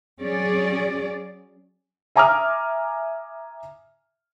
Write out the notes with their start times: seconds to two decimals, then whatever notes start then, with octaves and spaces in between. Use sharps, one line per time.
0.22 F#3 C#4 G#4 D5
2.16 E5 G#5 A#5 D6 D#6 F6